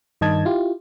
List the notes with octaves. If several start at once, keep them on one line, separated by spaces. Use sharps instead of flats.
G2 D#3 D#5 A5 G#6
E4 F4 G4